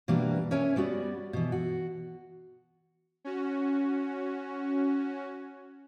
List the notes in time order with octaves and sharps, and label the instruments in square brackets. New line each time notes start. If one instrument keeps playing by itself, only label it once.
[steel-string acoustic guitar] B2 E3 G3 A#3 D4 A#4
C#4 A#4 C#5 E5 G#5
G3 B3 F#4 D5
B2 E3
F#4
[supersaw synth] C#4 F#4